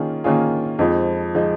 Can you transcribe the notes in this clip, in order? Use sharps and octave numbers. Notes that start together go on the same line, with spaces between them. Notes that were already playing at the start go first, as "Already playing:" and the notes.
Already playing: D#3 A#3 C#4 F4 G#4
D#3 A#3 C#4 F4 G#4
F2 F3 G#3 D#4
F3 G#3 D#4